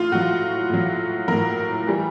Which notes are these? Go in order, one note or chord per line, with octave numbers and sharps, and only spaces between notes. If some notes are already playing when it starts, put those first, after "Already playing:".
Already playing: A2 F4
A2 F#3 F#4
A2 F#3
A2 F#3 A#4
E3 G3